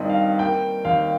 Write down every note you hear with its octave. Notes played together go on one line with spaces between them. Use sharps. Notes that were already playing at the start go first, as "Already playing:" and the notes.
Already playing: G2 D#3 G3 C4 D#5
F5
A#3 G5
D#2 F5